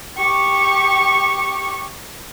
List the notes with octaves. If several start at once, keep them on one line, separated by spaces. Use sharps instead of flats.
G4 C#6